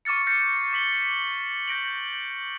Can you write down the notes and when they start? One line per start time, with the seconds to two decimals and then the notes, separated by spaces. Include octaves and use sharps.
0.05 C#6 D6 F6 A6 C#7
0.27 F6 G6 A6 A#6 C7 C#7
0.73 D6 B6 F#7 G7
1.68 G6 A#6 D7 F#7